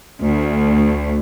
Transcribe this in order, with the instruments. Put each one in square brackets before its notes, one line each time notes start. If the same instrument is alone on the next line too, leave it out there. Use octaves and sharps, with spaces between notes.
[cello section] D2